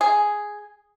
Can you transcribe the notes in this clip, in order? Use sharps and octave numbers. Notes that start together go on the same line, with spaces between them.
G#4